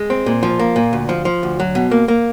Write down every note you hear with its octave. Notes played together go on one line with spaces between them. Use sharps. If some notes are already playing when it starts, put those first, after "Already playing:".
Already playing: G#3
C4
A#2
F3
A#3
A#2
D2
F3
F3
D2
F#3
B2
A#3
A#3